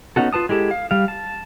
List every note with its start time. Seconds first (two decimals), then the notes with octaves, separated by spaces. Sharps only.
0.16 B3 C#4 D#4 F#4 A4
0.33 F4 B4 A5 D#6
0.49 G#3 E4 G4 A4
0.71 F5
0.91 G3 F5
1.08 A5